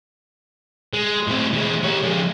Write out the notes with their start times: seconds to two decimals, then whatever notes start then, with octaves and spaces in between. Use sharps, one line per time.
0.94 G#3
1.27 A2 C4
1.54 E3 G#3
1.84 G4 C#5
2.03 F3 G#3